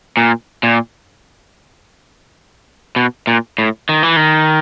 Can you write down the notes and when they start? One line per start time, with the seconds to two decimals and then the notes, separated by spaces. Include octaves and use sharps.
0.17 A#2
0.63 A#2
2.96 B2
3.27 A#2
3.58 A2
3.89 D#3
4.03 E3
4.16 D#3